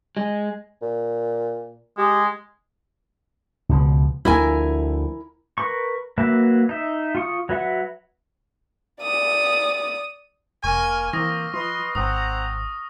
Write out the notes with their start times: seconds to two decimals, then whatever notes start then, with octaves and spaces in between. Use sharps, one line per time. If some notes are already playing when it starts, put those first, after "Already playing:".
0.17 G#3
0.82 A#2
1.98 G#3 G4
3.69 C#2 B2 F3
4.25 D2 F3 E4 A#4 G#5
5.58 A#4 B4 C#6
6.18 F#3 A#3 B4 E5
6.69 D#4 E5
7.15 F4 C#6 D#6
7.49 F#3 B4 E5 F#5
9.03 D5 D#6
10.64 F1 A#3 A#4 G#5 C#6 F6
11.13 E3 A#3 C4 C#6 D#6 A#6
11.54 F3 B4 D#5 C6
11.95 G#1 C4 F#5 A#5 D#6